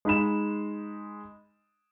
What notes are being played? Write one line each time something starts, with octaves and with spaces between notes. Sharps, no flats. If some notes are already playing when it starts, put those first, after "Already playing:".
G#3 D#4 B5 E7